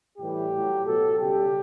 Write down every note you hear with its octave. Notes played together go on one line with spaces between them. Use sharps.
A2 E3 G3 G4
A2 F#3
B2 F#3 A4
C#3 G3 G4